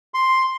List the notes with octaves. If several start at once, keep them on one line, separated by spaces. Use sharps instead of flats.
C6